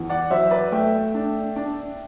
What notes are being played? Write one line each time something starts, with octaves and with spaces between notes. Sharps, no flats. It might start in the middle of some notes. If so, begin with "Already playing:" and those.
Already playing: E2
D5 F#5
F#3 C5 E5
B4 D5
A3 E5 G5
D4
D4